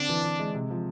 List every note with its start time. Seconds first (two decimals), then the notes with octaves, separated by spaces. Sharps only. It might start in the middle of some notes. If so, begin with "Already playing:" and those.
Already playing: D3 C4 D4
0.09 E3
0.24 E3
0.39 G#3
0.55 C3
0.70 F3